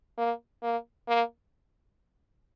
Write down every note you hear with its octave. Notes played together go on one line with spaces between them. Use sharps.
A#3
A#3
A#3